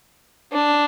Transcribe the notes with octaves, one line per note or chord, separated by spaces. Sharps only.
D4